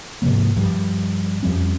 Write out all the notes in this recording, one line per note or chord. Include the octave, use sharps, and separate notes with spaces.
G#2 C3 F3 A#3
G2 F3 G3
F2 F3 G3 C#4